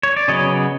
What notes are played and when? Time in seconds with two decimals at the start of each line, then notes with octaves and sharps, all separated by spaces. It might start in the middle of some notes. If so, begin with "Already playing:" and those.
0.03 C#5
0.17 D5
0.28 C#3 F#3 B3 C#5 D#5